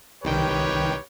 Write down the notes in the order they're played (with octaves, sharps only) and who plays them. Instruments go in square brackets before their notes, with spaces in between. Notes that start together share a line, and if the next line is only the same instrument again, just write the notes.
[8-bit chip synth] C2 D#3 G5 [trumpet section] G4 B4 C#5